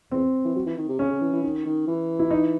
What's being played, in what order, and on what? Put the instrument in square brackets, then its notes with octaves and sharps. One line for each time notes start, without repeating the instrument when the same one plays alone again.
[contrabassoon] E2 [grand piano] C4
[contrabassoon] E3
F#3
E3
D#3
C3
[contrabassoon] C#3 [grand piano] C#4
[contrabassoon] C#3
E3
E3
D#3
D#3
E3
[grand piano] E4
D#4